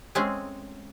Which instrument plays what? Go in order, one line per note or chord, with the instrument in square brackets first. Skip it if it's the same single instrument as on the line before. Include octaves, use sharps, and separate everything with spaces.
[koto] G#3 A3 C4 C#4 G#4 D#5